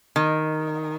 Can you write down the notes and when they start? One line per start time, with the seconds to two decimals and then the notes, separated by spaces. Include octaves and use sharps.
0.16 D#3